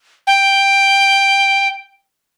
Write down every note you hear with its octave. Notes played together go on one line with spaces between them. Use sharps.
G5